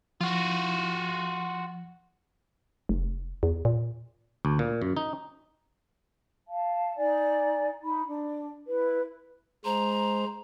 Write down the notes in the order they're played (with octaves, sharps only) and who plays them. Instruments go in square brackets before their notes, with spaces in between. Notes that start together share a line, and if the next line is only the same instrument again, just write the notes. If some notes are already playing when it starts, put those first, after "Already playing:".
[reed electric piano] F3 [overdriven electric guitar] F4 F#4
[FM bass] F1
E2
A#2
[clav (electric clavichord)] D2
A#2
F#2
D#4
[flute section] F5 A5
D#4 D5 G#5
D#4 B5
D4
E4 B4
[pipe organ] G#3 C5 [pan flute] A#5